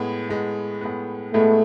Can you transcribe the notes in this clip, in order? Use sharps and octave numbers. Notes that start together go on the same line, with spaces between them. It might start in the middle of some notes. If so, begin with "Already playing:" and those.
Already playing: A2 G#3 B3
A2 G#3 B3
A2 G#3 B3
A2 G#3 A3 B3